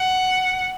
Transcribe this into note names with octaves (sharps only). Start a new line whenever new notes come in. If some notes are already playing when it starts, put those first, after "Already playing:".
Already playing: F#5